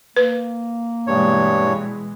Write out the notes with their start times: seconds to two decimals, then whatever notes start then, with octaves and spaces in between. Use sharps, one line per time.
0.16 A#3 B4
1.07 G2 B2 E3 G#3 C#5